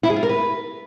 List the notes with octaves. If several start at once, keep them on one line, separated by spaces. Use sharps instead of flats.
E4
G#4
F4
A#4
B4